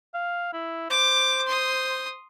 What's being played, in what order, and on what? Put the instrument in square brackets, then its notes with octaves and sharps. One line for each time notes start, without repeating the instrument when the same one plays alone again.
[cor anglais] F5
E4
[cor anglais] C5 [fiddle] D6
[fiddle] C6 D#6